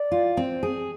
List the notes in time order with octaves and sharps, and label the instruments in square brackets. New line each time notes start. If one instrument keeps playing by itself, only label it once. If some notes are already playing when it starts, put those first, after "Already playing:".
Already playing: [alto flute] D5
[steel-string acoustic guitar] F4
C4
G#4